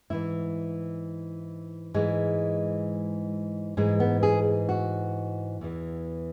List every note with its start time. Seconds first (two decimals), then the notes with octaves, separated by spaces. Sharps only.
0.10 G#2 E3 E4
1.94 G#2 E3 G#3
3.77 G#2 E3 G#3
4.00 B3
4.23 G#4
4.69 F#4
5.61 E2 E3